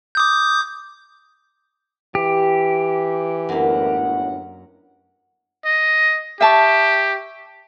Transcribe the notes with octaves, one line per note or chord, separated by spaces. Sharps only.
D6 D#6 G6
E3 G4
G1 F#2 A2 A#3 F#5
D#5
G4 E5 A5 C#6